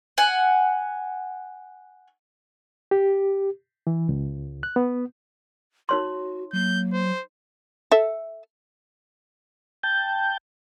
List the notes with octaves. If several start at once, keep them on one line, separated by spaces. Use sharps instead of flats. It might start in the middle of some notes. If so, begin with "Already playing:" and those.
F#5 G#5
G4
E3
C#2
F#6
B3
D#4 F#4 C#5 C6
F#3 A#3 G6
C5
A4 E5
G5 A5 G6